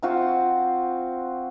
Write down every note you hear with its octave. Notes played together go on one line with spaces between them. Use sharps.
C4 F4 F#4 C5